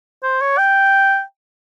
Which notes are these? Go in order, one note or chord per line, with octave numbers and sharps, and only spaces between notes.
C5
C#5
G5